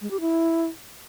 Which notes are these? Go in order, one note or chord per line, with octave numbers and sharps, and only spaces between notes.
G#3
G4
E4